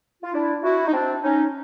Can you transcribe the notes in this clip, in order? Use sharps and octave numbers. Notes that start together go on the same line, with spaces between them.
F4
D4 E4
E4 F#4
D#4
C4 D4
C#4 D#4